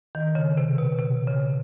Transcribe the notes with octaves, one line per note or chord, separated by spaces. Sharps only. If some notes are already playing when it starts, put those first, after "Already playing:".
D#3
C#3
C3
B2
C3
C#3